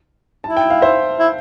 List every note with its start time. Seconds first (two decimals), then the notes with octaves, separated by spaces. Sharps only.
0.44 E4 A5
0.57 G5
0.70 F5
0.82 C5 E5
1.19 E4